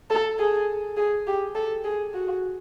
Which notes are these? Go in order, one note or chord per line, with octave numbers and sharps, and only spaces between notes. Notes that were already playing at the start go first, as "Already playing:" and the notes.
A4
G#4
G#4
G4
A4
G#4
F#4